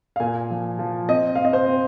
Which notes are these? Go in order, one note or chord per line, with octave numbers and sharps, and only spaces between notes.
F5
A#2 G#5
F3
F3
C4 D#5
C4 F5
D#5
C5
C4